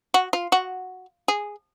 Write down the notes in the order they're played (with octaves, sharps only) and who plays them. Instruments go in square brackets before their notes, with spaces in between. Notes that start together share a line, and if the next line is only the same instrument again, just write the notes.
[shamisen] F#4
F4
F#4
G#4